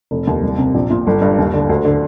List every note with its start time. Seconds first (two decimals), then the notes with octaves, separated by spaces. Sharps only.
0.11 F1
0.27 D#2
0.43 C2
0.58 C3
0.74 A#1
0.90 A#2
1.07 G1
1.22 G2
1.39 D#2
1.54 D3
1.69 D2
1.85 D3